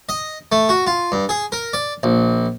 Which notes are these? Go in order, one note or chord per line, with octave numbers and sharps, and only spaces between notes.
D#5
A3
F#4
F4
G2
G#4
A#4
D5
A#1